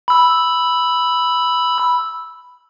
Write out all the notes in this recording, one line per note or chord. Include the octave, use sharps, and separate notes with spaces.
B5 E6